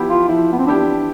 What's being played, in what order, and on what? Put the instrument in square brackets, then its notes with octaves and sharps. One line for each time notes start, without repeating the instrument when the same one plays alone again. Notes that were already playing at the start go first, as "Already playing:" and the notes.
Already playing: [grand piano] F3 B3 E4 G4
[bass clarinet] F4
[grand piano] F3 [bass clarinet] E4
[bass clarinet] B3
C4
[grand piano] B3 E4 G4 [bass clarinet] D4